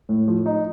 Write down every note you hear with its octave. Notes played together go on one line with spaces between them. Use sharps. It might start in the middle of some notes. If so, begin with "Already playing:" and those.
A2
F3
D#4